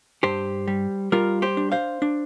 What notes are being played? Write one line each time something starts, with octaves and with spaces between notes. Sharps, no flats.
G2 G4 C5
G3
G3 F4 A#4
G4 C5
D4
C5 F5
D4